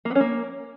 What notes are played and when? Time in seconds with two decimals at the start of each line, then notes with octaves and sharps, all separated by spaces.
0.05 A#3
0.10 B3
0.15 C#4
0.20 A#3